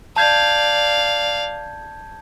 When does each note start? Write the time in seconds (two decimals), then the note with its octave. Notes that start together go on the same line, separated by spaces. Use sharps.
0.16 D5 F5 A5 G6 G#6